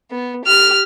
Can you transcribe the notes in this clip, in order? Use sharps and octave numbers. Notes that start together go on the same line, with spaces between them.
B3
G4 F6